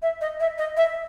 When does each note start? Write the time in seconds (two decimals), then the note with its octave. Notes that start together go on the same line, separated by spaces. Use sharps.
0.02 E5
0.21 D#5
0.40 E5
0.58 D#5
0.77 E5